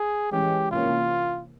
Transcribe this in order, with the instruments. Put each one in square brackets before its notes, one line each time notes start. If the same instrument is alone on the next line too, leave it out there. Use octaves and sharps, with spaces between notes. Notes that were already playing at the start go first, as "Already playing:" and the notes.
Already playing: [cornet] G#4
[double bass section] E3 G#3 C#4 [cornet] G4
[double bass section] C3 E3 A#3 C#4 [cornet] F4